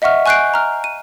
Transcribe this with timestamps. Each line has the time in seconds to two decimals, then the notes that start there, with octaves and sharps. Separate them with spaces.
0.02 D#5 E5 F#5 C#6 F6
0.26 G#5 C#6 F#6 G6 C7 D7
0.54 A#5 F6
0.84 D#7